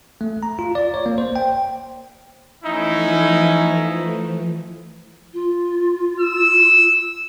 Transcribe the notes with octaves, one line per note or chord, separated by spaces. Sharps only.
A3
A#5
F4
D5
C#5
A#3
C5
G5
E3 F3 A3 C#4 D#4 E4
F4
E6